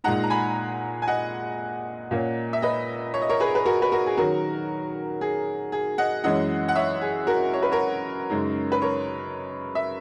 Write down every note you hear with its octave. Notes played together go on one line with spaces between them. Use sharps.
A#2 G#3 D#4 F#5 A#5
A#5
G#5 B5
G#5
D#5 F#5
A#2 A#3 C#4
E5
B4 D#5
C#5
D#5
A#4 C#5
G#4 B4
B4
F#4 A#4
B4
F#4 A#4
G#4
D#3 F#3 C#4 F#4 A#4
G#4
G#4
D#5 F#5
F#2 E3 G#3 C#4 D#5 F#5
F#5
C#5 E5
G#4
F#4 A#4
C#5
B4
A#4 C#5
F#2 C#3 G#3 D#4
B4
A#4 C#5
E5